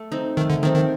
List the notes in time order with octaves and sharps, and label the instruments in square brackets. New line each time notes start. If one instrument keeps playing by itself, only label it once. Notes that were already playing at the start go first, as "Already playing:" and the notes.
Already playing: [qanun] A3
C4 D#4
[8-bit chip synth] D#3 [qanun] A3
[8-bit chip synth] D3
[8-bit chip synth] D#3 [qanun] C4 D#4
[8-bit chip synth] D#3